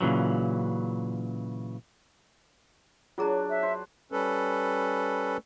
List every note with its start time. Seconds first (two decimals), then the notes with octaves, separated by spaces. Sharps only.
0.01 A#2 C#3 E3 F#3
3.18 F#3 D4 F4 G#4 A#5
3.50 E5
3.63 B4 C5
4.12 G3 C#4 A4 B4